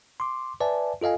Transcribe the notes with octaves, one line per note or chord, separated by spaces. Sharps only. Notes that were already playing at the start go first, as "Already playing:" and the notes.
C6 D6
B4 D5 E5 G#5 A5
F4 A4 D#5 F5 G#5